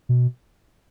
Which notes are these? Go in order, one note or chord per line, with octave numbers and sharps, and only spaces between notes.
B2